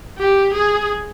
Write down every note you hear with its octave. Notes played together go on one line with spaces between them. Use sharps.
G4
G#4